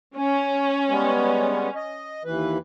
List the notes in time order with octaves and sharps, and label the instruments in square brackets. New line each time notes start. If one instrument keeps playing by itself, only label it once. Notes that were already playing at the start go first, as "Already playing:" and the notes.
[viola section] C#4
[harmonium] G3 G#3 B3
D#5
D#2 E3 B4